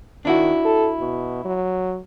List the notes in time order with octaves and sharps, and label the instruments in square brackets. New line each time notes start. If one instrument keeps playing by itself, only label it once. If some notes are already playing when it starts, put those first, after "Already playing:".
[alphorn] D#3 [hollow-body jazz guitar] D4 E4 F#4
[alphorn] A4
B2
F#3